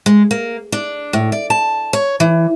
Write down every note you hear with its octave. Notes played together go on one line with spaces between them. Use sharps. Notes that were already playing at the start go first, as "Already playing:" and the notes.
G#3
A#3
D4
A2
D5
A5
C#5
E3